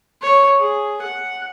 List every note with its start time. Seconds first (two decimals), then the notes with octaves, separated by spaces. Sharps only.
0.21 C#5
0.59 G#4
1.02 F#5